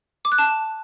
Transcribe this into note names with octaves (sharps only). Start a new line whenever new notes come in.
D6
F#6
A5